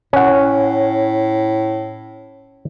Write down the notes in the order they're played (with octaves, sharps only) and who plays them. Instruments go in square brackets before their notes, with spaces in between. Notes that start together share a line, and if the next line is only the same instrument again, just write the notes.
[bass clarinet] A2 [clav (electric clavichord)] C#4 F#5